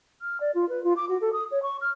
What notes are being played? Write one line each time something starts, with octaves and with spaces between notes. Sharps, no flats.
F6
D5
F4
B4
F4
D6
F#4
A4
D#6
C#5
C#6
F6